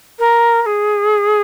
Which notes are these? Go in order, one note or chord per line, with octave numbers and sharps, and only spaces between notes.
A#4
A#4
G#4